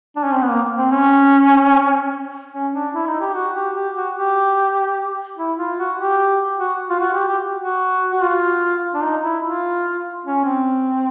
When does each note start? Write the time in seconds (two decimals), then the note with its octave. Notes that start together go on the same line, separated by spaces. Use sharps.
0.16 D4
0.24 C#4
0.33 C4
0.42 B3
0.50 A#3
0.78 C4
0.91 C#4
2.53 C#4
2.74 D4
2.94 E4
3.07 D#4
3.21 G4
3.34 F#4
3.55 G4
3.75 G4
3.96 F#4
4.16 G4
5.38 E4
5.58 F4
5.78 F#4
5.99 G4
6.59 F#4
6.90 F4
7.00 F#4
7.14 G4
7.28 G4
7.61 F#4
8.12 F#4
8.22 F4
8.94 D4
9.03 D#4
9.24 E4
9.43 F4
10.25 C#4
10.45 C4